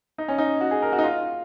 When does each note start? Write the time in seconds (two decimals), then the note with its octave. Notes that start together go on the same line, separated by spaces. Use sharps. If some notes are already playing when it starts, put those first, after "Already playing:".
0.18 D#4
0.28 C#4
0.38 D#4
0.61 F#4
0.71 G#4
0.82 A#4
0.93 F#4
0.98 D#4
1.04 F4